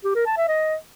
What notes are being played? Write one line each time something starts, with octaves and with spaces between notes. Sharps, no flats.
G4
A#4
A5
E5
D#5